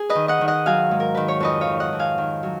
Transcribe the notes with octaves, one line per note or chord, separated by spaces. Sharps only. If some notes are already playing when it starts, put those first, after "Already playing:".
Already playing: G#4
B4 D#5
D#3
D#5 F#5
D#3
D#5 F#5
F#3 F5 G#5
G#2
A#4
D#3 B4
C#5
F2 B4 D#5
C#5 F5
D#3
D#5 F#5
F2
F5 G#5
D#3
F#3